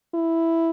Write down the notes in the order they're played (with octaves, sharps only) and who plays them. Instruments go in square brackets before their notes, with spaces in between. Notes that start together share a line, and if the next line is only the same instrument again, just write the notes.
[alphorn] E4